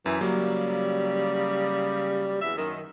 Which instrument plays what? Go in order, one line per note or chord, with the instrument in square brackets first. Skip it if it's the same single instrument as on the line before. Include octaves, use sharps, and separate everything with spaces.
[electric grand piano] F#2 [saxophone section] E3
[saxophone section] C#3 G3 [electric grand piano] F#3 A#3
[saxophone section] E2 E5
F#2 D#3